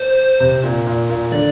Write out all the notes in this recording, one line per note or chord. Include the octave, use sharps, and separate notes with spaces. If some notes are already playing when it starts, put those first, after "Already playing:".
Already playing: C5
C3
A#2
A#2
A#2
D3 D5